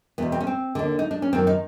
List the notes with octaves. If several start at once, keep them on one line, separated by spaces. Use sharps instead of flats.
E2 B2 B3
C4
C#4
C4
D#2 D3
D#4
D4
C#4
F#2 D#3 C4
D#4